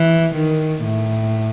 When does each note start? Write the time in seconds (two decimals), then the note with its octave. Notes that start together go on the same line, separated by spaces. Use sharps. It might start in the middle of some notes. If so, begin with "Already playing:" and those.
Already playing: E3
0.35 D#3
0.84 A2